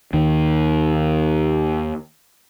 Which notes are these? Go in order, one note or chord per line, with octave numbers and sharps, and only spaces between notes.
D#2 D#3